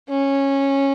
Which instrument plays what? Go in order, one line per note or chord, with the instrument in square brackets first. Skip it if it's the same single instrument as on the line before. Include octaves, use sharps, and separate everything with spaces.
[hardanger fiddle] C#4